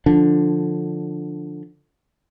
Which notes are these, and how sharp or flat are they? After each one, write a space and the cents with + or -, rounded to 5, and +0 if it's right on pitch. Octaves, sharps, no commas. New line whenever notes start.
D3 +5 F3 +5 D4 +0